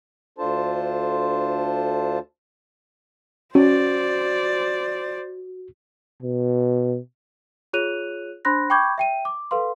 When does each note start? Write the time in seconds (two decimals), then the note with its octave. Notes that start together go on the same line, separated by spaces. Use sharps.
0.38 D2 D4 F4 A4 C5 A5
3.55 C#4 F#4 C5 D5
6.23 B2
7.73 F4 G#4 C#5 F#6 D#7 F7
8.45 D4 C5 B5 C6 F#6 A#6
8.70 G5 B5 C#6 D6 G6 G#6
8.98 E5 G5 D#7
9.25 D6
9.51 A4 B4 F5 C6